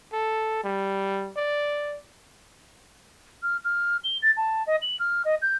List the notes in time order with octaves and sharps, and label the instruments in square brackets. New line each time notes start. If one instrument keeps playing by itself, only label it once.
[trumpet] A4
G3
D5
[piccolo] F6
F6
G7
A6
A5
D#5
F#7
F6
D#5
G6